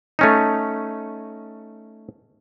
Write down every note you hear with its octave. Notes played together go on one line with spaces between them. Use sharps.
A3 C#4 D#4